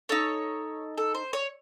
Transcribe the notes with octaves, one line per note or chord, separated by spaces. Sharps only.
D#4 A4 C#5
A4
C5
C#5